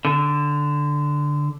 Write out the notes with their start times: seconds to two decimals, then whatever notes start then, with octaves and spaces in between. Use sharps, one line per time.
0.05 D3